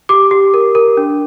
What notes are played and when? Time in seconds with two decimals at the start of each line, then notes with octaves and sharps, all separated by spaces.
0.09 G4 D6
0.31 G4
0.54 A#4
0.75 A#4
0.97 D4